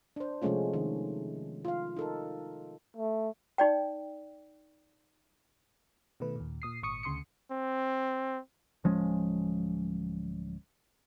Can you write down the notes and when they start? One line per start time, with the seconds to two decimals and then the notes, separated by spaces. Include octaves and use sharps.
0.16 D4 C5
0.42 C3 F3 G#3 A3 C#4 F4
0.73 D#3
1.65 F4 F5
1.97 D#4 A4 A#4
2.97 A3
3.58 D#4 D5 G5
6.20 B2 D#3 A3 B4
6.36 D#2 A#2
6.62 A#2 D#6 C7
6.83 G#1 A#2 C#6 D#6 C#7
7.03 D2 C#3 C6 D#6 C#7
7.51 C4
8.84 D1 F3 G#3 C#4